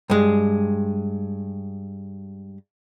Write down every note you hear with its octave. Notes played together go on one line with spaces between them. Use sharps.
G2 G#3